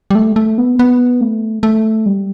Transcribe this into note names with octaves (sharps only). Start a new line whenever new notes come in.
G3
A3
A3
B3
B3
A3
A3
G3